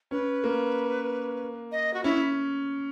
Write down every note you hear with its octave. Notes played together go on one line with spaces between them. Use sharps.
C#4 B4
A#3
D#5
F#4
C#4 E4